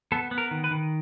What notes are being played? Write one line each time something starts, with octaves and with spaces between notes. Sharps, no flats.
B3 A4
B3
A#4
D#3
B4
D#3